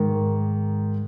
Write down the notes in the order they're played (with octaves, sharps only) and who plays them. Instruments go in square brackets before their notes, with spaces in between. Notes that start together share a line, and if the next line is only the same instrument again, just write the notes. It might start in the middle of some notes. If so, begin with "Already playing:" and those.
Already playing: [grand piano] G#2 D#3